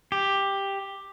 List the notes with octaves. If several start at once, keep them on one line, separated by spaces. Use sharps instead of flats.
G4